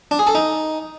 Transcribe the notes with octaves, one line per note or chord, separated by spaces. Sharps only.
D4
G#4
A4
D#4